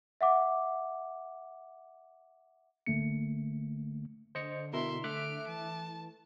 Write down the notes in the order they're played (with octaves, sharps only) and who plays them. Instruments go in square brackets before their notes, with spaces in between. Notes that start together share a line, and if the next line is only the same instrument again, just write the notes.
[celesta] E5 F#5 D6
[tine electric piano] A1 D3 A3 A#3 C#7
[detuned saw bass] D3 [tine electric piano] C5 D#5 C#7
[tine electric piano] B2 [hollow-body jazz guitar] E4 A#4 [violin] E5 C6
[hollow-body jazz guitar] A3 [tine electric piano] E5 D6 F#6 [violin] F6 D7
[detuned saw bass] E3 [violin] A5